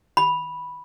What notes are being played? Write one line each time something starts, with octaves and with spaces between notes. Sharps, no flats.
B5